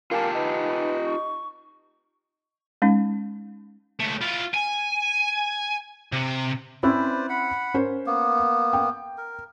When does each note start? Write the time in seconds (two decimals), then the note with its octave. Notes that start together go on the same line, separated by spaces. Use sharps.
0.11 A#3 F4 G4 G#5 A5
0.35 D#4 B4
1.05 C#6
2.82 G#3 C#4 D#4
4.00 C#2 A3
4.21 E4 F4
4.54 G#5
6.12 C3
6.83 C4 C#4 E4 B4 C5 D5
7.29 F#5 B5
7.74 C#4 A#4 C5
8.07 A#3 B3
8.73 G5
9.18 A#4